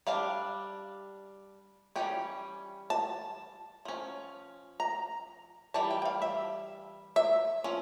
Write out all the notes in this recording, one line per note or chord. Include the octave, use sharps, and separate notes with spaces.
G3 D4 F5
E3 G3 C#4 G5
A5
F3 C#4
A#5
E3 G3 A5
G5
G5
F5
E5
E5
F3 C#4